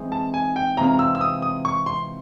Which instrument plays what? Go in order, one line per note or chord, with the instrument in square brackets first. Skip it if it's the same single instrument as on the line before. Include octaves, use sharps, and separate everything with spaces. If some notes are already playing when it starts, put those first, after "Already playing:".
Already playing: [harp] E3 G#3 C4 D#4 G#4
[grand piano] A5
G#5
G5
[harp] C3 E3 G#3 C4 F4 [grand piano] A#5
[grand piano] E6
E6
D#6
D#6
C#6
C6